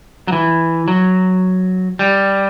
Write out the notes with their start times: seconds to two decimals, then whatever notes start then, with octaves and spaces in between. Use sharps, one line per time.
0.28 F#3
0.32 E3
0.88 F#3
1.99 G3